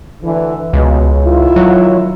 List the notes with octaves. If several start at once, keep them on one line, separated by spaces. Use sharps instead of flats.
D2 D3 E3
C#2 B2
D#3 E4 F4
F#3